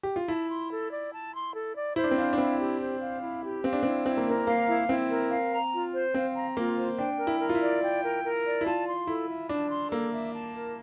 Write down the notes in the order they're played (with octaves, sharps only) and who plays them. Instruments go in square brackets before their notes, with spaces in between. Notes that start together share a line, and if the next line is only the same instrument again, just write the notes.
[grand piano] G4
F4
[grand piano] E4 [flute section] A5
[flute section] C6
A4
D5
A5
C6
A4
D5
[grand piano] E4 [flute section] C5
[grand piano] D4
C4
[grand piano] D4 [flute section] F5
[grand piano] D4
[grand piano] C4 [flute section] E4
[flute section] G4
C5
F5
E4
G4
[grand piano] C4 [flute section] F5
[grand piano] D4
[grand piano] C4 [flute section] E4
[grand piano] C4 [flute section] E4
[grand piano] A#3
[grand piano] C4 [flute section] A#4
[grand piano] A#3 [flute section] F5
[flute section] E4
[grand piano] C4 [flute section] E4
[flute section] A#4
F5
A#5
F4
C5
[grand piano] C4 [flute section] F5
[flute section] A#5
[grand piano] A#3 [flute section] F4
[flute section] C5
[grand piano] D4 [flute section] G5
[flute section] A#4
[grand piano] E4
[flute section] A#4
[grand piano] F4
E4
[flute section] D5
G5
A#4
A#4
D5
[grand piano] E4
[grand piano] F4 [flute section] A5
[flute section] C6
[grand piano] E4 [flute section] A4
[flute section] E5
[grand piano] D4 [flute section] A5
[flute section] C6
[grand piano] A#3 [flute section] A4
[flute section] E5
A5
A#4